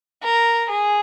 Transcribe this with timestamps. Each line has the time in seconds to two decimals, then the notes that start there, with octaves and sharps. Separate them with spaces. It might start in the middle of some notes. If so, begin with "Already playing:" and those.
0.23 A#4
0.69 G#4